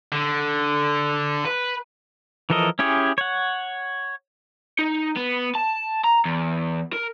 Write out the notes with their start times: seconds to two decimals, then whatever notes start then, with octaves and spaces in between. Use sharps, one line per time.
0.12 D3
1.45 B4
2.50 E3 F3 A4 A#4 D#5
2.79 C#4 E4 G4 G#4 C#5
3.18 C#5 F#5
4.79 D#4
5.16 B3
5.55 A5
6.04 A#5
6.25 E2
6.93 A#4